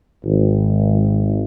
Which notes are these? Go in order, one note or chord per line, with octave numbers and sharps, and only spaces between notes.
G#1